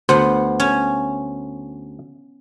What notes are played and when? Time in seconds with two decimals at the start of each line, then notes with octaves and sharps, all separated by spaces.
0.09 D2 B3 C5 F#5
0.60 C#4